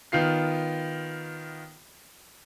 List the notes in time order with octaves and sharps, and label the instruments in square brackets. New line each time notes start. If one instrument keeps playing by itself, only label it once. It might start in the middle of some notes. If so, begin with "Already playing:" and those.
[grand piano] D#3 B3 F4 C7